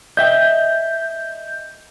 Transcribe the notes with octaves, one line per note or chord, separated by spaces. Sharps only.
D#5 E5 G5 G6